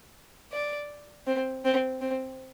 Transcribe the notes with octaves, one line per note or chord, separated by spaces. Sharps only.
D5
C4
C4
C4